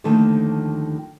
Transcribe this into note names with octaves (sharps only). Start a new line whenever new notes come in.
D#2 D3 D#3 F3 A3 A4